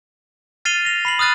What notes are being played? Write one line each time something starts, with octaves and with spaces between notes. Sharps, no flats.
F6 A6 C7 D#7 F7 G7
A#6 F7
B5 C7 F#7
D#6 F6 F#6 A6 D#7